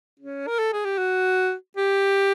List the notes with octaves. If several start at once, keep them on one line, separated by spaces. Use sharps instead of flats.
C#4
A#4
A4
G#4
G4
F#4
G4